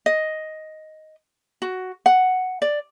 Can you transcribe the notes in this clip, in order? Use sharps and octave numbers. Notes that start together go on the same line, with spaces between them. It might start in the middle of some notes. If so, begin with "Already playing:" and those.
D#5
F#4
F#5
D5